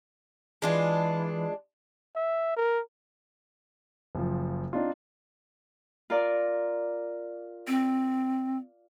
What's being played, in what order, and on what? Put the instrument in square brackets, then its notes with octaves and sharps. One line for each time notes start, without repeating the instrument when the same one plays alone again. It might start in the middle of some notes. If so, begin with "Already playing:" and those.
[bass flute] E3 [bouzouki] G#3 D4 F4
[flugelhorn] E5
A#4
[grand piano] F#1 F3
C4 D4 D#4 F4
[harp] F4 A#4 D5
[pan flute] C4